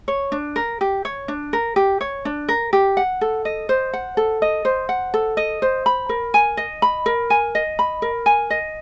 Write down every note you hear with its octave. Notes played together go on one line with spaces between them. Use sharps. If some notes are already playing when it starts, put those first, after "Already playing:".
C#5
D4
A#4
G4
C#5
D4
A#4
G4
C#5
D4
A#4
G4
F#5
A4
D#5
C5
F#5
A4
D#5
C5
F#5
A4
D#5
C5
B5
A#4
G#5
D#5
B5
A#4
G#5
D#5
B5
A#4
G#5
D#5